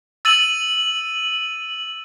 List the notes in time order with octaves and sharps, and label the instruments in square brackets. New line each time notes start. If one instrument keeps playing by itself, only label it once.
[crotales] E6 A6 D#7 F#7